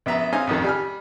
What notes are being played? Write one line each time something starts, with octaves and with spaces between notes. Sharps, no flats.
A#1 B3 E5 A#5
C4 C#4 D#4 D#5 F5 G#5
A1 F2 D#3
G3 G#5 F6